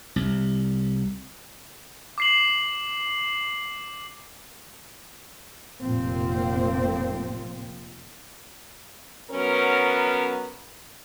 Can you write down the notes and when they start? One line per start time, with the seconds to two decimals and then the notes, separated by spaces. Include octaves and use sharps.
0.16 C2
2.18 D6 C7 F#7
5.82 F1 A#2 F3 A#3 C4
9.31 F#3 B3 C#4 A#4